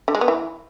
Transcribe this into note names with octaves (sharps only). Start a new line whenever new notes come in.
D3
G#3
B3
E3